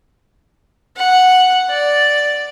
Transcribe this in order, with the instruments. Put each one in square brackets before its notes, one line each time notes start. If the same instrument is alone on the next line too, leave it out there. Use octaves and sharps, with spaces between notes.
[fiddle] F#5
D5